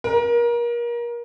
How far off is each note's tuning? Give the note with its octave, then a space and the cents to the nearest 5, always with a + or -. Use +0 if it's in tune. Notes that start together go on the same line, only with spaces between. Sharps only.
A#4 +30